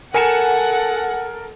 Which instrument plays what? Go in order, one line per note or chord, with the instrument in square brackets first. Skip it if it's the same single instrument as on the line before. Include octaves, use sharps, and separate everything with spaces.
[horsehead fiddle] A4 [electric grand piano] A#4 [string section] F#5 [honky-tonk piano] G#5 C#7 E7